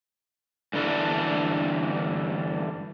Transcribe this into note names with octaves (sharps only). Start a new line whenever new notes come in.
G2 D3 E3 D4